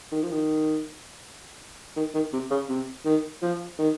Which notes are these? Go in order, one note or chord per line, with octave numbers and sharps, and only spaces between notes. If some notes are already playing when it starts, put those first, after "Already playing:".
D#3
F3
D#3
D#3
D#3
C3
C#3
C3
D#3
F3
D#3